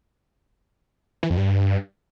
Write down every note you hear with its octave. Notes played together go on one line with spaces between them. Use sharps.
E3
F2
G2